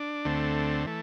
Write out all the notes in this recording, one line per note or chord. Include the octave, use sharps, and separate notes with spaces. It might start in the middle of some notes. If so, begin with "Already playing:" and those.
Already playing: D4
D2 D3 A3 C4
E3 A3